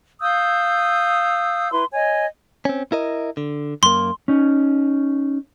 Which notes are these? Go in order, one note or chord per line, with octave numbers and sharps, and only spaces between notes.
F5 D#6 E6 G6
E4 B4 C6
C#5 D#5 G#5
C4 C#4
E4 A#4 D#5
D3
F#2 A#3 C6
C#4 D#4